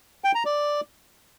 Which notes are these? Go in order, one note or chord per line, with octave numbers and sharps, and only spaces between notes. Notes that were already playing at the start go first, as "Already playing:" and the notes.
G5
A#5
D5